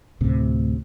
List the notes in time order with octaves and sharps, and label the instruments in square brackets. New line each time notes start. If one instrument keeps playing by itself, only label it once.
[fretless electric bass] D2 A2 C3